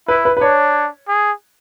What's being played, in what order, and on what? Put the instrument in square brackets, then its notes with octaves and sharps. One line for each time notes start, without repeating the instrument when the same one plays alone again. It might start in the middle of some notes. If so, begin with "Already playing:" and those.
[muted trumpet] E4 [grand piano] B4
[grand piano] B4
B4
[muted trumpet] D4 [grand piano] C#5
[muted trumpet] G#4